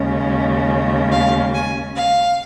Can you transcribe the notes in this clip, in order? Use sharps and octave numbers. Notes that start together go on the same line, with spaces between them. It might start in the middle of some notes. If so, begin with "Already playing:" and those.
Already playing: D#2 C#3 G#3 C#4
F5
G#5
F5